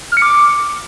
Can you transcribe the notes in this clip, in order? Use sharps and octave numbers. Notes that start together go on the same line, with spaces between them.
F6
C#7
D6